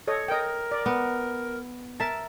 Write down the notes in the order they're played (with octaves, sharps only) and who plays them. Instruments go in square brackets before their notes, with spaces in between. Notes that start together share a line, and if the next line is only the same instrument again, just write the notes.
[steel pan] A4 C#5 D#5
[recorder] A#4 [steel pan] D#5 G5
[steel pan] D5
[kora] B3
[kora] A#4 E5 [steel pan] A5